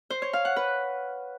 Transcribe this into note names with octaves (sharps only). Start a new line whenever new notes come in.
C5
C#5
F5
F#5
B4